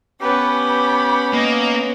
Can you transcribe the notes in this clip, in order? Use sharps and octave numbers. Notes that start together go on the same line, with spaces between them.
B3 C#4 G4 B4
B5
A#3 D#5